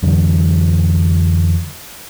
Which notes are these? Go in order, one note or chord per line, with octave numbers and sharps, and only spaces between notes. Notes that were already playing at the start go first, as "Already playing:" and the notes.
F2 D3 E3 F#3